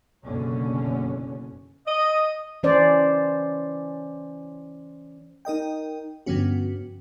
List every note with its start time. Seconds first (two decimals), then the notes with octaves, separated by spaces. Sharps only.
0.24 F#1 B2 D3 C#4
1.86 D#5
2.63 E3 C#4 C5 D5
5.45 D#4 A#4 D#5 G5
6.26 G2 D3 F3 B3 C#4 F#4